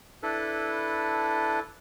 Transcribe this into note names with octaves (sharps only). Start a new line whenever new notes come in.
D4 E4 A4 B4